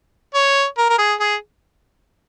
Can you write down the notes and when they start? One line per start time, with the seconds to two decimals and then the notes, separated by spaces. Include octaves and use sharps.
0.34 C#5
0.78 A#4
0.90 A#4
0.98 G#4
1.20 G#4